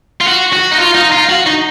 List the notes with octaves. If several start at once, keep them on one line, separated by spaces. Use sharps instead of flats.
F4
F#4
F#4
D#4
F4
D#4
F4
F#4
D#4